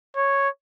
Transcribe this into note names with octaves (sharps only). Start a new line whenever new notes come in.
C#5